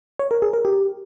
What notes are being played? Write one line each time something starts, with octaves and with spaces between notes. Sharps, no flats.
C#5
A#4
G#4
A#4
G4